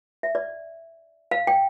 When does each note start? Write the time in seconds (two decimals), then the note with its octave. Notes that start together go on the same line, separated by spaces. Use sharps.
0.23 E5
0.35 D5
1.31 F5
1.47 G5